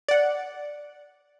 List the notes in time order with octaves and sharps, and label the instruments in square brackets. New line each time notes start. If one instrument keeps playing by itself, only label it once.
[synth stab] D5 F#5